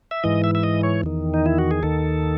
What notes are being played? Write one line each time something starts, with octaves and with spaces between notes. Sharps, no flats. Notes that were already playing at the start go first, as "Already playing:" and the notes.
E5
G#2 E3 D#5
E5
E5
D#5
C#5
E2 D#3
D#4
E4
F#4
G#4
D#2 D#3 A4